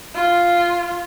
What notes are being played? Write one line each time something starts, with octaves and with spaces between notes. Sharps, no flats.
F4